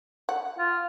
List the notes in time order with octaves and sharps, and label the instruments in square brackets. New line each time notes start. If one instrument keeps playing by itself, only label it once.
[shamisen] F#5
[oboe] F4